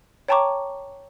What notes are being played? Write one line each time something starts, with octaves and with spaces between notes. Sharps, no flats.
C#5 G5 A5 A#5 C#6 D6